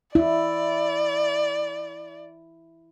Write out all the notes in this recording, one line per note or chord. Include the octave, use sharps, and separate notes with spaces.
E4 D5